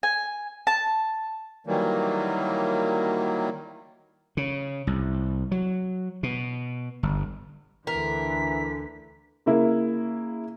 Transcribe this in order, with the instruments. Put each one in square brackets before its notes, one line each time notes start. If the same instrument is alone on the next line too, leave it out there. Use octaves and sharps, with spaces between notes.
[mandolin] G#5
A5
[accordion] D#3 E3 F#3 G3 A#3
[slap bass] C#3
C2
F#3
B2
G1
[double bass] D2 D3 [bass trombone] E3 [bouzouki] A#4 [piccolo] B6
[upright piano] C#3 A#3 E4